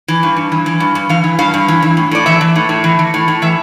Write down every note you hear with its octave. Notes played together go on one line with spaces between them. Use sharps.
E3
G2
G2
E3
E3
G2
G2
E3 F5
E3
G2 F5
G2
E3
E3
A2
A2 D5
E3 E5
E3
A2
A2
E3
E3
A2
A2
E3 E5